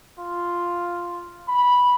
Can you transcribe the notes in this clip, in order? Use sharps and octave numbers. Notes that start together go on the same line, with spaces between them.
F4
B5